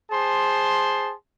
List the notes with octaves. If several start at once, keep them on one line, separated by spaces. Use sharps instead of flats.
G#4 C5 A5 C6